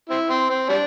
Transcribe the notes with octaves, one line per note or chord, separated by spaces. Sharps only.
C4 E4
C4
C4
G3 D4